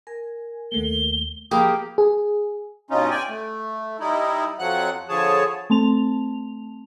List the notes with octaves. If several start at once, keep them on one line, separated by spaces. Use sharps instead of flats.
A#4 G#5
D#2 A3 A#3 G7
F3 A#3 G4 G#4 G5 B5 D#6
G#4
G2 B2 C#4 D#4 F4
D5 G5 G#5
A3
G3 D#4 E4
F2 F3 F#3 F#5 F#6
D3 F3 G#4 C#5 A5
A3 C4 A5 F7